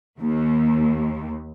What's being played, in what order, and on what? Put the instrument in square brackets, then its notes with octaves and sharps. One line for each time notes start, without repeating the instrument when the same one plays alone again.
[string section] D#2